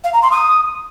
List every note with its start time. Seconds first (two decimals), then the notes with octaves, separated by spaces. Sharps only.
0.03 F5
0.12 A#5
0.22 C6
0.31 D#6